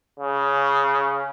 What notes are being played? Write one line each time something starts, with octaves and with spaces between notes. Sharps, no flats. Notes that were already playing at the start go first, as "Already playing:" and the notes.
C#3